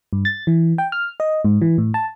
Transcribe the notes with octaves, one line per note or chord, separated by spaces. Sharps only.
G2
A6
E3
G5
F6
D#5
G#2
E3
A2
A5